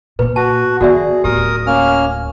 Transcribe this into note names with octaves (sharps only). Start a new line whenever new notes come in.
A#2 A#3 B4
F#4 A5
D#3 B3 F#4 G#4 D5 E5
D1 F4 G4 A#4 D#6
A#3 C#4 F6